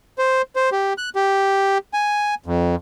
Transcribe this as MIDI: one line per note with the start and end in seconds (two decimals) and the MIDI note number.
0.18 0.42 72
0.56 0.70 72
0.72 0.93 67
0.98 1.10 90
1.15 1.78 67
1.94 2.35 80
2.46 2.75 41